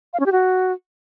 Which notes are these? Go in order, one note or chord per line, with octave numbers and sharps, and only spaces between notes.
F5
C#4
G4
F#4